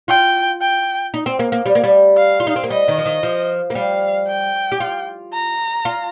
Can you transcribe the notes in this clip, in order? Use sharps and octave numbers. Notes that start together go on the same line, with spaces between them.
F4 G5
G5
D#4
C4
A#3
A#3
G3
A#3
G3
F5
F4
D#4
C4
A#3
G3 D#5
D#3
F3
D#3
F3
A#3
G3 F5
G5
G4
F4
A#5
F4